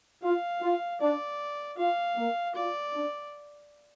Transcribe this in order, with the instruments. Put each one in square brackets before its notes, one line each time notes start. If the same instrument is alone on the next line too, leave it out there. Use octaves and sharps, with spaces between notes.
[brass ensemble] F4 [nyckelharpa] F5
[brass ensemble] F4
[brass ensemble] D4 [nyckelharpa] D5
[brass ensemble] F4 [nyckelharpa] F5
[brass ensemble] A#3
[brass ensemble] F4 [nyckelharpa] D5
[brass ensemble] D4